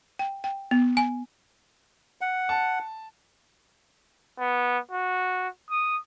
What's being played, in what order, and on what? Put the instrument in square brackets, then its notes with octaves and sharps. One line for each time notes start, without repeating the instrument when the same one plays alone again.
[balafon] G5
G5
B3
G#5
[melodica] F#5
[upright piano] A5
[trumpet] B3
F#4
D#6